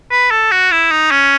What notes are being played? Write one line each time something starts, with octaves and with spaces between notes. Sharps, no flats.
B4
A4
F#4
E4
D#4
C#4